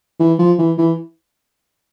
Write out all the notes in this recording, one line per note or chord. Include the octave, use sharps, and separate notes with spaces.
E3
F3
E3
E3